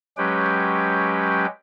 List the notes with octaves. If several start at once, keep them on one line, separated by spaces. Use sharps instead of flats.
F#3 G#3 C#4 G4 B4 G5